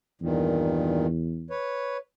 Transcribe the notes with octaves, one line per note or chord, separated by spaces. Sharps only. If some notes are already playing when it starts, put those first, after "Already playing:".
E2 G2 A#2 D#3
B4 C#5